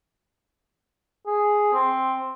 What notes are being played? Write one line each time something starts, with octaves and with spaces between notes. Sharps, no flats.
G#4
C4